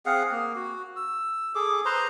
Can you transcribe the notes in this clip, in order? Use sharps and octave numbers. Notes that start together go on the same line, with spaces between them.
C4 G#4 F5 F#5
A#3
F#4
E6
G#4 A4 D6
B4 C5 A#5 C6